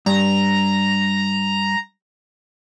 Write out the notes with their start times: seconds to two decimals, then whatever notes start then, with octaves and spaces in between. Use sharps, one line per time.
0.06 G2 A#5